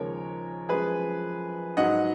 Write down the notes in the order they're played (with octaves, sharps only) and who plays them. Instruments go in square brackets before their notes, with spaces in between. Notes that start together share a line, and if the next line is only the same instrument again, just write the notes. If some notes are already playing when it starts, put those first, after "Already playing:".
Already playing: [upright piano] D#2 C#3 F3 G#3 A#4 C#5
F#2 F3 G#3 G#4 B4
G#2 F#3 D#5 F#5